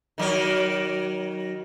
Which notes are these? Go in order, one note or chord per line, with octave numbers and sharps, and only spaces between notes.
D#3 F#3 A#4